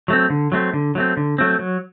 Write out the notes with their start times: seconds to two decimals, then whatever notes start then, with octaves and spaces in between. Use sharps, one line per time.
0.08 F#3 A3 C4
0.30 D3
0.52 F#3 A3 C4
0.74 D3
0.95 F#3 A3 C4
1.17 D3
1.38 F#3 A3 C4
1.59 F#3